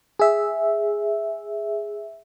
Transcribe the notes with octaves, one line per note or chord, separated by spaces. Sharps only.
G#4 E5